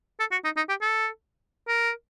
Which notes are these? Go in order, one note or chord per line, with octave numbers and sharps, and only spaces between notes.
A4
F#4
D#4
D#4
G4
A4
A#4